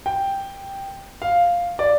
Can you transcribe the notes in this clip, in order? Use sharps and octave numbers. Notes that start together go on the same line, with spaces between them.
G5
F5
D5